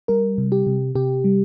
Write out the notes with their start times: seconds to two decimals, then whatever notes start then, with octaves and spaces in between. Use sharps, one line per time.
0.08 G3 A#4
0.38 C3
0.52 G4
0.67 C3
0.95 C3 G4
1.24 G3